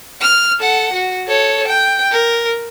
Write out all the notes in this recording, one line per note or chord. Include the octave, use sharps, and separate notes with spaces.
F6
A4 F#5
F#4
A4 C#5
G5
A#4